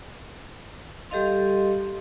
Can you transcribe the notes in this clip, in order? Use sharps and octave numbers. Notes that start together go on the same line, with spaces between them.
G3 G4 A4 D#5 F5 C6